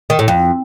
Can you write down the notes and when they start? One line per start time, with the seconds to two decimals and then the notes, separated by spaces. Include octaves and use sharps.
0.10 D#3
0.19 A2
0.28 F2